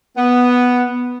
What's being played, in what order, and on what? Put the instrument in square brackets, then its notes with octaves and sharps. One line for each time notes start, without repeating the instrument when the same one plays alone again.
[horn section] B3